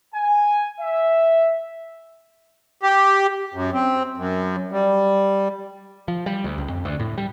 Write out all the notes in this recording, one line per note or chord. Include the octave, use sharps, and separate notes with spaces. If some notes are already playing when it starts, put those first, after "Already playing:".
G#5
E5
G4
F#2
C4
F#2
G3
F3
G3
D2
C#2
F2
D2
A2
G3